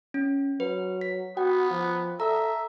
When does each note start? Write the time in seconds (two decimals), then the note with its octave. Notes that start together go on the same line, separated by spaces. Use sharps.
0.14 C#4
0.60 F#3 B4
1.01 B6
1.37 B3 F#4 G5
1.71 F3
2.20 A4 E5 A#5